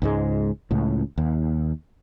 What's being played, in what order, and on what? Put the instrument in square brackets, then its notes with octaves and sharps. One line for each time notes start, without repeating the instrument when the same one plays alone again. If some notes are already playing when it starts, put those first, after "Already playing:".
[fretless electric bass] C#2 G#2 G#3
C#2 A2
D#2